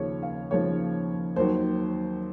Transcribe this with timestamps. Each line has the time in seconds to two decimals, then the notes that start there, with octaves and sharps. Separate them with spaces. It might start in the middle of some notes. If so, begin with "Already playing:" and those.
Already playing: D#2 C#3 F3 C#5
0.23 F5
0.51 D#2 C#3 F3 C#5
1.36 D#2 D#3 F#3 C5